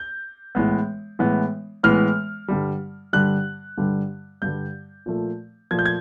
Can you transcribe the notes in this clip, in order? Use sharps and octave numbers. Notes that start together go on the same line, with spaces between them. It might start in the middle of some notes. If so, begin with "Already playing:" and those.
Already playing: G6
A2 E3 G#3 B3
A2 E3 G#3 B3
A2 E3 G#3 B3 F6
G2 D3 G3
G2 D3 G3 F#6
G2 D3 G3
G2 D3 G3 G6
A#2 F3 A3
A#2 F3 A3 G#6
G6
G#6